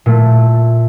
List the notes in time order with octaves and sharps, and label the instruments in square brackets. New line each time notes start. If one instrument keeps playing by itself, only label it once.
[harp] A#2 A3